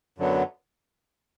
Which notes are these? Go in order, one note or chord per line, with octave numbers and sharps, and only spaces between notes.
F#2 D3 F#3 B3